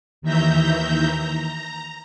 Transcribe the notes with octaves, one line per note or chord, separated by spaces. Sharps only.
D#2 D#3 E3 E5 A#5 G6
A#5